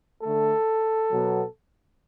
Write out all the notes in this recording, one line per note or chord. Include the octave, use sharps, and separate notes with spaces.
D3 A3 A4
B2 F#3 B3